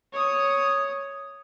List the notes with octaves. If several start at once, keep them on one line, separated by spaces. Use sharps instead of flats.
C#5 D#6